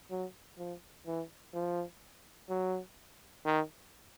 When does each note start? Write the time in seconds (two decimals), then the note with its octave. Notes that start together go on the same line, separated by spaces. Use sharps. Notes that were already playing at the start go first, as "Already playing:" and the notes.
0.11 F#3
0.58 F3
1.07 E3
1.54 F3
2.50 F#3
3.46 D#3